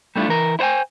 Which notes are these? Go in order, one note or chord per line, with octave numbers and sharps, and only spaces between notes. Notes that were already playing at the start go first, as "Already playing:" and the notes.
G3 A3 D4 E4 F4
E3 A#4
E4 C5 C#5 G5 G#5